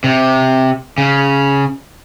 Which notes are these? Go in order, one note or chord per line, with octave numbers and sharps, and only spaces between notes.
C3
C#3